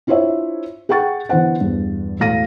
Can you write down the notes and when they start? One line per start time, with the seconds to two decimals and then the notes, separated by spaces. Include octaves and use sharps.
0.07 D4 E4 F4 C5 C#5 E5
0.89 G#4 F#5 G5 C#6 A6
1.29 D3 E3 B3 C5 F#5
1.60 E2 G2
2.20 E1 A2 F5 A#6 D#7